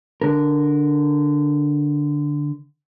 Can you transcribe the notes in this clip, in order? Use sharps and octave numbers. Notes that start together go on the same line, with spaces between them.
D3 A#4